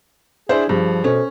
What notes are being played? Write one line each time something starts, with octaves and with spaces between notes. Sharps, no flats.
D4 E4 G#4 C5
G2 F3 G#4
B2 C#4 A4 C5